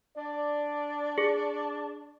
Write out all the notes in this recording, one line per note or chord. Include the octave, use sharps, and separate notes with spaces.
D4 D5
G#4